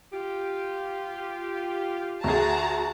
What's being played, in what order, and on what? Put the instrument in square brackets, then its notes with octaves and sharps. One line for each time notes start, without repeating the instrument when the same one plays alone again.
[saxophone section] F4 G4
[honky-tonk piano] D2 G#4 [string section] F#4 A5 A#5